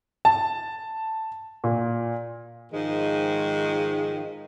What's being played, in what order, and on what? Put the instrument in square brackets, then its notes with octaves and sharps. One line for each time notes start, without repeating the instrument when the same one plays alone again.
[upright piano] A5
A#2
[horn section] G#2 D#3 F3 G#3